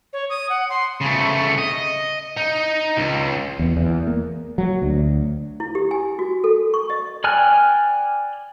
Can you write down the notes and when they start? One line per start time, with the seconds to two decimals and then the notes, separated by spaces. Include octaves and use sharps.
0.13 C#5
0.30 D#6
0.50 F#5
0.70 C6
1.01 C#3 A3
1.58 D#5
2.37 D#4
2.97 C#2
3.59 E2
3.77 E2
4.07 A#3
4.58 F#3
4.82 D2
5.60 E4
5.75 G4
5.91 G#5
6.19 F#4
6.44 A4
6.74 C#6
6.90 D#5
7.24 D5 G5 G#5 F6 F#6